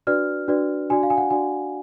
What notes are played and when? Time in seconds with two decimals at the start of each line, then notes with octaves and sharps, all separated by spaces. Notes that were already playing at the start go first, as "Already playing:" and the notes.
0.07 D4 F#4 B4 D5 F6
0.48 D4 F#4 B4 D5
0.90 D4 F#4 D5 G#5
1.03 F5
1.10 G#5
1.17 F#5
1.30 D4 F#4 D5 G#5